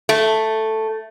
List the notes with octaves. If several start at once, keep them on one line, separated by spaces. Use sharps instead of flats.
A3